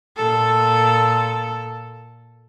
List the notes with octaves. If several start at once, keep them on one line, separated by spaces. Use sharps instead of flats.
A#2 A4